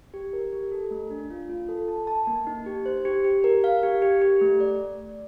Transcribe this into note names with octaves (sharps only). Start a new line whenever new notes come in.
G4
A#4
G4
A4
A3
D4
F4
F4
A4
A5
A5
A#3
D#4
G4
C5
G4
G4
A#4
F5
G4
G4
G4
A3
D5